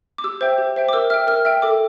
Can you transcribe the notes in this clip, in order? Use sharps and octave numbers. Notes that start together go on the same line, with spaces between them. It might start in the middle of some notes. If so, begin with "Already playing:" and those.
D6
G4 E6
C5 E5 G5
G4
C5 E5 G5
D6
A#4 E6
E5 G5 F6
A#4 F6
E5 G5 E6
A4 D6